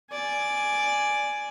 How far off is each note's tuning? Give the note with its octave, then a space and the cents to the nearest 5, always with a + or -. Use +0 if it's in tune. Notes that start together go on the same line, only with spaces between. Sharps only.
D5 +0 G#5 +5